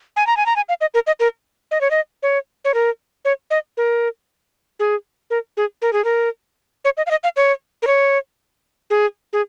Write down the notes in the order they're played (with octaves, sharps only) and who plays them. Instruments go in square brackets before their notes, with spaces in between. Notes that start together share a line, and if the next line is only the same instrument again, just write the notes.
[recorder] G#5
A#5
G#5
A#5
G#5
F5
D#5
A#4
D#5
A#4
D#5
C#5
D#5
C#5
C#5
A#4
C#5
D#5
A#4
G#4
A#4
G#4
A#4
G#4
A#4
C#5
D#5
F5
D#5
F5
C#5
A#4
C#5
G#4
G#4